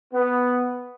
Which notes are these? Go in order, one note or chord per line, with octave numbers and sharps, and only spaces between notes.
B3